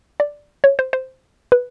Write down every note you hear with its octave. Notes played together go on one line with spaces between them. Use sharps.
D5
C#5
C5
C5
B4